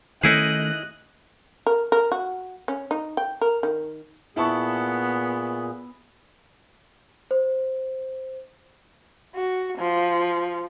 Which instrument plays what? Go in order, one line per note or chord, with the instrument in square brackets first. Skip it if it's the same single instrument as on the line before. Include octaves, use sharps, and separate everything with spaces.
[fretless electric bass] D#3 A3 C#4 [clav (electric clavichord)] D#4 E4 G#4 [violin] D#5 F#6
[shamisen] A#4
A#4
F#4
C#4
D#4
G5
A#4
D#3
[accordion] A#2 G#4 [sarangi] B3 [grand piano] E4 A5 C#6
[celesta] C5
[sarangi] F#4
F3